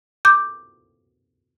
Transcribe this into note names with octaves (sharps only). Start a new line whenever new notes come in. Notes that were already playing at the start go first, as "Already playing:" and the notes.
D6 G6